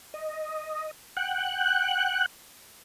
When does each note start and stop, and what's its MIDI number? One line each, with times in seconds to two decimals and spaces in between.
0.14 0.91 75
1.17 2.26 78
1.17 2.26 79
1.17 2.26 90